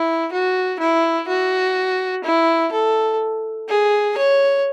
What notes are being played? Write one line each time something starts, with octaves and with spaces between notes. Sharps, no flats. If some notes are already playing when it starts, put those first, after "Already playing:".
Already playing: E4
F#4
E4
F#4
E4
A4
G#4
C#5